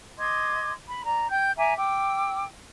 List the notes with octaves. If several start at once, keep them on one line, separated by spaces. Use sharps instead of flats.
D#5 C6 D6 G#6
B5
D5 A#5
G5 G6
E5 G#5 A#5 D6
G5 D6 E6